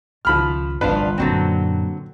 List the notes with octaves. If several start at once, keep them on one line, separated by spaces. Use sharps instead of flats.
C#2 D#3 F3 B5 F6
G1 C2 F3 D4 F4 B4
F#2 A#2 D3 F#3 C4